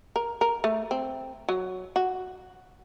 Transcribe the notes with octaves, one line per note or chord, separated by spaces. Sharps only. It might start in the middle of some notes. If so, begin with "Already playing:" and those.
A#4
A#4
A3
C4
F#3
F#4